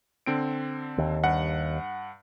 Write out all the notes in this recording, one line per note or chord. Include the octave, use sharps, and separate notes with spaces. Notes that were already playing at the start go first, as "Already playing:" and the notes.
D3 C4 D7
D#2
G2 F#5